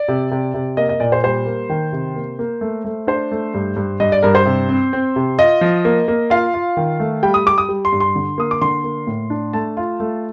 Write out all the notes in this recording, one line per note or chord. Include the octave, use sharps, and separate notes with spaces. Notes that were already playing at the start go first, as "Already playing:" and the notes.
Already playing: D5
C3
C3
C3
A#3 D#5
D#5
A#2 D5
C5
G3 C5
A#3
D#3
C3
A#3
A#3
A3
A3
D4 C5
A3
G2
G2
G2 D#5
D5
G2 A#4
C5
C3
C4
C4
C3
F4 D#5
F3
A#3
A#3
F4 F5
F4
D#3
A3
G3 G5
D#6
G3 D6
D#6
G3
C6
G2
C6
D3
A#3 D#6
D6
D3 C6
A#3
A2
D4
A3 A5
F4
A3